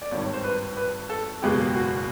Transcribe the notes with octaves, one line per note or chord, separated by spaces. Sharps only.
D5
G#1 G2 D#3 C#5
C#5
C5
B4
B4
A4
F#1 E2 B2 G#3 G4
F#4